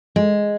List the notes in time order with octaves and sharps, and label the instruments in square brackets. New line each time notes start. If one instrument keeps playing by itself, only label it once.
[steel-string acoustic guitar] G#3